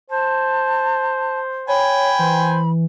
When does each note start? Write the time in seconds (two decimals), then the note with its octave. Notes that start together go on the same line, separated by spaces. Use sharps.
0.10 C5 A5
1.68 C#5 G5 G#5 B5
2.19 E3 C5